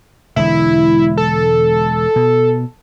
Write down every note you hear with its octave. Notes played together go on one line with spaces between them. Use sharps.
E1 D3 G#3 E4
A4
B2